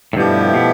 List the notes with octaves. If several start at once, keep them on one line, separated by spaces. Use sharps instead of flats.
A2
G2 B2 F3 A3 E4 G4
B2